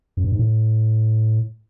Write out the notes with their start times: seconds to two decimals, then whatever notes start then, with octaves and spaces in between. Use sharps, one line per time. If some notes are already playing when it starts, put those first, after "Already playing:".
0.17 F#2
0.24 G2
0.32 G#2
0.39 A2